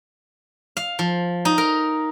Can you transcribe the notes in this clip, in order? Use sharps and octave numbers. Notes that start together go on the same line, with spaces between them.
F5
F3
D#4
A#4